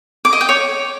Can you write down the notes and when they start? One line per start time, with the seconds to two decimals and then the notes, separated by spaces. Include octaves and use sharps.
0.25 D6
0.33 D#5
0.41 G5
0.49 C#5